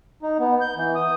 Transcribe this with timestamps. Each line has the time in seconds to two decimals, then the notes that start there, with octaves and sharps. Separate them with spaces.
0.23 D#4
0.39 B3
0.61 G6
0.76 E3
0.96 D#6